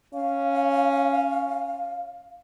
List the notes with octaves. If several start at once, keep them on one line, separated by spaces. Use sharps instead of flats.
C#4 F5